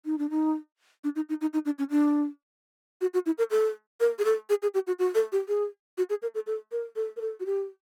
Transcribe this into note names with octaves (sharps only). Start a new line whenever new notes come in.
D#4
D4
D#4
D4
D#4
D#4
D#4
D#4
D4
C#4
D4
F#4
F#4
E4
A#4
A4
A#4
G#4
A4
G#4
G#4
G4
F#4
F#4
A4
G4
G#4
F#4
G#4
A#4
A4
A4
A#4
A4
A#4
A4
F#4
G4